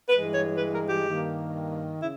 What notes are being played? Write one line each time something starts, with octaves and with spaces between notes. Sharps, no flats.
G2 E3 G#3 B4
C#5
B4
A#4
G4
G2 D#3 A#3
C#3 E4